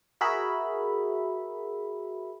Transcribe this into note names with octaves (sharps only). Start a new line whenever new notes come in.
F#4 G#4 A#4 E5 B5